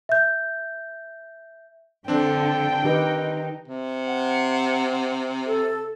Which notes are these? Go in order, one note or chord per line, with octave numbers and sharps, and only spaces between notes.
E5 G6
D3 C4 D4 A4 G5
D#3 D#4 G4 B4
C3
F#5
A4